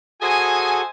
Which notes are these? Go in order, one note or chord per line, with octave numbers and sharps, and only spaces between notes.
F#4 G#4 A4 C5 D#5 G#5